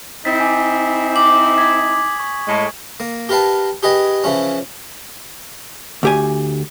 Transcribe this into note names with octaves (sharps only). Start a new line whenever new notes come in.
C4 D#4 E4 A6 B6
G#5 D6
D6 F#7
D#6 G#6 B6
C#6
A2 G#3
A#3
G4 A#4 B4 F5 A5
G4 G#4 B4 D#5
C#3 E3 F3 C#4
D2 G4 G#5